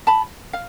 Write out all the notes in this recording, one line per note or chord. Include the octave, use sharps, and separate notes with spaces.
A5 B5
F5